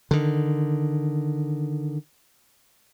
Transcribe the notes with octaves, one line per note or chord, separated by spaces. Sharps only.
D3 D#3